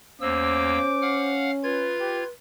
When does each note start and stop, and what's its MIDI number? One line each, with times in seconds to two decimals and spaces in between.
0.21 0.78 40
0.21 0.78 58
0.21 1.96 61
0.21 1.32 72
0.21 1.39 86
0.21 0.78 88
1.02 1.51 77
1.02 1.51 78
1.02 1.51 89
1.63 2.24 65
1.63 2.29 71
1.63 2.24 92
2.01 2.24 67